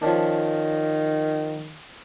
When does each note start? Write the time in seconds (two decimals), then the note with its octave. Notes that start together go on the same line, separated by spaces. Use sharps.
0.02 D#3 F3 C#4 D4